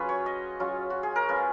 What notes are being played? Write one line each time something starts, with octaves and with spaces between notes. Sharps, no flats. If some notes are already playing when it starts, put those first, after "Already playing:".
Already playing: F#3 C#4 F4 G#4 B4
C#5
D#5
F#3 C#4 F4
F#4
G#4
A#4
G#3 C#4 F4 B4